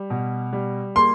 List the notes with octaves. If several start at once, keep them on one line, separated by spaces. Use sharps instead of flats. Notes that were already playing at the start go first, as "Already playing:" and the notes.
Already playing: G3
B2
G3
A#3 C6